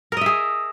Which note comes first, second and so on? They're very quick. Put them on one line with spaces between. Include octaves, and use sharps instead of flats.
A#4 D#5 E5 G#4